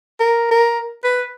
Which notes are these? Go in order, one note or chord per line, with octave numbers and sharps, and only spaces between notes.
A#4
A#4
B4